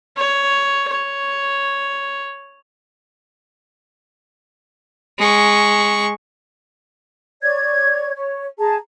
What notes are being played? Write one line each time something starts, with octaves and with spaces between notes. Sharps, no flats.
C#5
C#5
G#3 C#6
C#5 D5 G#6
C#5
G#4 A5 A#5